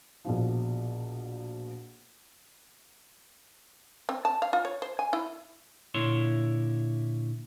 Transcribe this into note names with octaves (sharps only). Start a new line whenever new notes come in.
A#1 B2 F3
C4
A5
F5
F4
C#5
C5
G#5
E4
A#2 D3 E4 C#5 C6